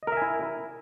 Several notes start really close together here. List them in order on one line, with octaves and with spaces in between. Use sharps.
D#5 A#4 E5 G#5 E4